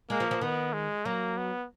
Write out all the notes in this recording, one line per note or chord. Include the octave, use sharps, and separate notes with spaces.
G#3 A#3
F3
F3
D#3 B3
G#3
F#3 A#3
B3